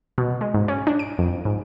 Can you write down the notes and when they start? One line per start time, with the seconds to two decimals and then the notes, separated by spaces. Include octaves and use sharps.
0.18 B2
0.41 G#3
0.54 G#2
0.68 C#4
0.87 D4
0.99 D7
1.19 F2
1.45 G#2